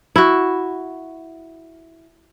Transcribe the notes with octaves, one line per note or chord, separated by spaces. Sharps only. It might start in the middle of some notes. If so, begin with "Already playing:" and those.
E4 F#4